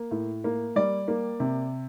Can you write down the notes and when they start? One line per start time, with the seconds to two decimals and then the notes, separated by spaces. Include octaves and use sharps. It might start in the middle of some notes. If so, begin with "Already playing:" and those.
Already playing: A#3
0.11 A2
0.44 A#3
0.76 G3 D5
1.08 A#3
1.40 C3